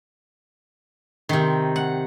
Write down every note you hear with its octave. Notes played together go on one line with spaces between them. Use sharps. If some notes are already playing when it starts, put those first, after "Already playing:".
C3 D#3
F#5